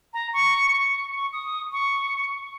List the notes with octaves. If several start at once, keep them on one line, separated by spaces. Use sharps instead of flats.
A#5
C#6
C#6
C#6
D#6
C#6